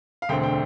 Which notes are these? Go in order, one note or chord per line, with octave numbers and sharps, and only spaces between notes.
F5
E1 D2 D3 A3 C4 G5
G5